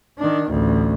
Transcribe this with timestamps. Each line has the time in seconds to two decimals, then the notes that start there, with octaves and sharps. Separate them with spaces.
0.18 D#3 D4
0.49 A1 D2